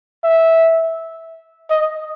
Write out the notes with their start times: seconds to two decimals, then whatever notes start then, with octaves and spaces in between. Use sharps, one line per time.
0.24 E5
1.70 D#5